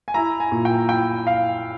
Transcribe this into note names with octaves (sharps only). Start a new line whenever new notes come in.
G#5
E4 A#5
G#5
A#2
G5
E4 G5
F5